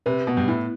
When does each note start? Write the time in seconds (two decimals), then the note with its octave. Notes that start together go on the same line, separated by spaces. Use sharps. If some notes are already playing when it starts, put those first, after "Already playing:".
0.06 C3 B4
0.27 B2 B3
0.37 G2
0.48 A2 E4